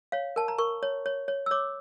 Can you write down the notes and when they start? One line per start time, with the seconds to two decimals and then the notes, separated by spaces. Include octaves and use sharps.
0.12 C#5 F5
0.36 A#4 A5
0.48 A#5
0.58 A#4 C#6
0.83 C#5
1.06 C#5
1.28 C#5
1.46 E6
1.51 C#5 D6